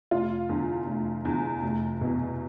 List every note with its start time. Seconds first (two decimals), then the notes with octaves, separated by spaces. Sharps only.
0.11 F1 F4
0.49 E2 D3
0.86 F1
1.25 E2 D3
1.62 F1
2.01 E2 B2